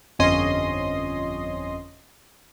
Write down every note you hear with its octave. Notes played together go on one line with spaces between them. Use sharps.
G1 F2 C#4 D#5 C6